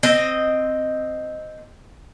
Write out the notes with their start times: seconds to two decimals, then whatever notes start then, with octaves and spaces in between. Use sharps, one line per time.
0.03 C4 D#5